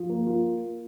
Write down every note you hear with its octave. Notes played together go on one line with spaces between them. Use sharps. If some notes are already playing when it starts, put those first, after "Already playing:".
Already playing: F3
A#3
F4